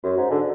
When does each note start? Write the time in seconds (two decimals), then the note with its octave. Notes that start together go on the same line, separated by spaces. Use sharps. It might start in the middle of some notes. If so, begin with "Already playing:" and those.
0.04 F#2 F#4
0.17 G#2
0.31 D3